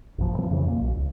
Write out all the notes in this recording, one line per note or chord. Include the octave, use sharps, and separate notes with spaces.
A1 F#2 A#2 F3
E3 F3 G3 C4
F2 C#3 E3
A#2 A#3
B1
C#2